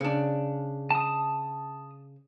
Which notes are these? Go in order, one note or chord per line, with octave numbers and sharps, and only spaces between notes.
C#3 D4
A5 D#6